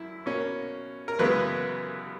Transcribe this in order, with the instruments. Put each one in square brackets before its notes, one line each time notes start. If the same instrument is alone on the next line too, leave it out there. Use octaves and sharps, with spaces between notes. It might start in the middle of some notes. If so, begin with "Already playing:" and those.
Already playing: [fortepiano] F#2 E4
B2 A#3 C#4
A#4
F#2 C#3 E3 G#3 B3 B4